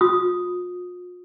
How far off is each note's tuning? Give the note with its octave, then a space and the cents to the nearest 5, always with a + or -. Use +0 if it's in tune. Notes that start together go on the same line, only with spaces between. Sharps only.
F4 +45 D#6 +0